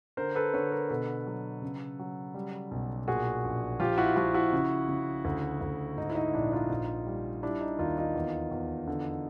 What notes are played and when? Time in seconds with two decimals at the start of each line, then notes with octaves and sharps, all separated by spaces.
0.17 D3 A#4 C5
0.35 A4 B4
0.54 D3 B4 C#5
0.72 A#4 C5
0.90 B2 A4 B4
1.27 F#3
1.62 C#3
1.99 F#3
2.34 G3
2.71 B1
3.08 A#2 F#4 G#4
3.44 A#1
3.80 F3 F4 G4
3.98 E4 F#4
4.16 F3 E4 F#4
4.34 E4 F#4
4.53 C#3
4.89 C#3
5.25 D2
5.61 D2
5.97 G#2 D#4
6.10 E4
6.15 D#4
6.34 A#1 D4 E4
6.52 D#4 F4
6.70 A#1
7.06 G3
7.43 G3 D4 E4
7.61 D#4
7.79 D#2 D#4 F4
7.98 D#4 F4
8.15 E2
8.51 E2
8.88 D3